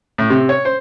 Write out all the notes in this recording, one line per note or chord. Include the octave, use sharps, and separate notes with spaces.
A2
C3
C#5
C5